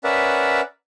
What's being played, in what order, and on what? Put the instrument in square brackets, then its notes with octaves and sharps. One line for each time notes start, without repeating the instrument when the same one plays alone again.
[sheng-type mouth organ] C#4 A#4 B4 D5 E5 F#5